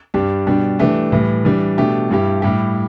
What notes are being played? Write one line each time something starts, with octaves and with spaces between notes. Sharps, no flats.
G2 G3 D4 G4
B2 G3 D4 G4
E3 A3 D4 G4
A2 E3 G3
E3 G3 D4
B2 A3 D4 G4
G2 G3 E4 G4
A2 G3 E4 G4